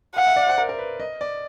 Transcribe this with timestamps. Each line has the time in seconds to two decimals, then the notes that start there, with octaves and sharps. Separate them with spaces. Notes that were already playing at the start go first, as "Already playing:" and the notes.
0.15 F5 F#5
0.27 E5
0.36 D5
0.47 C5
0.58 A#4
0.69 A#4
0.79 B4
1.00 D#5
1.21 D5